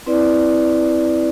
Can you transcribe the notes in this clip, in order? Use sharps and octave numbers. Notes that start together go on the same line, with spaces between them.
C4 E4 B4 D5